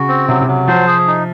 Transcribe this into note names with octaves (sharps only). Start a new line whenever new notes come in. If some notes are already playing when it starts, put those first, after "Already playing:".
Already playing: C#3 F#4
C4
C3 F#3
C3
F#3
F3 C5
G#4
D#4